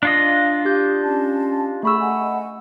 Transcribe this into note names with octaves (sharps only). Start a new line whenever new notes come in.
D4 F4 D#5 F5
G4 G6
C#4 A5
A3 G#4 F#5 B5 C#6 E6
D#5 F#5 G#5